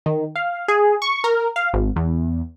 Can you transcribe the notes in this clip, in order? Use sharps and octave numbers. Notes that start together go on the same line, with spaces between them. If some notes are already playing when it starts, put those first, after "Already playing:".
D#3
F5
G#4
C#6
A#4
F5
G#1
E2